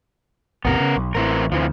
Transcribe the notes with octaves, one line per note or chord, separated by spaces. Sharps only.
A1 D#2 C3 B3 A#4
C#3
B1
A1 E3 C4 A#4
D2 C3 E3 F3